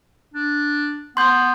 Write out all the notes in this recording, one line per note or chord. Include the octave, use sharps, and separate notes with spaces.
D4
B3 C6 G6